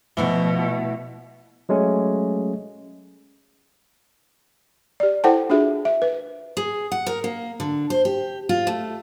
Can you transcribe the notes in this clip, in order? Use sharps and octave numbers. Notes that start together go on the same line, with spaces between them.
B2 E3 F3 A3 E4 F#4
F#3 G#3 A3 C#4
G4 D5
E4 A4 C5 F#5 G5 A5
D4 F4 F#4 G#4 E5
E5
B4
G#4
F#5
A#4
A#3
D3
C5
G4
F4
A3